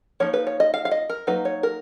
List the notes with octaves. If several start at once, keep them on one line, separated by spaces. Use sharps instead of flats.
F3 A#3 D#4 C#5
B4
C#5
D#5
F5
F5
D#5
A#4
F#3 A#3 D#4 B4
C#5
A#4